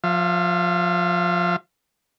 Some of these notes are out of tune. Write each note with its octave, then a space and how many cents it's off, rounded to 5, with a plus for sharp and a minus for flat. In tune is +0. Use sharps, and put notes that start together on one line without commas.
F3 +20 F5 -45